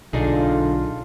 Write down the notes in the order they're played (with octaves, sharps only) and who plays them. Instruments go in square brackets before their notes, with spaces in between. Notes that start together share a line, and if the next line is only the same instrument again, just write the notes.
[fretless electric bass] B1 [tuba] D3 [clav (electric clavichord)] D4 D#4 G#4 [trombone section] F4